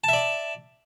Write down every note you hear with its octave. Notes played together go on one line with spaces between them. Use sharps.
D5 E5 A5